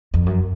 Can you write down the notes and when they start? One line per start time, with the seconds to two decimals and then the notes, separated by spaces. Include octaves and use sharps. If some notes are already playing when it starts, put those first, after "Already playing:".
0.14 F2
0.26 F#2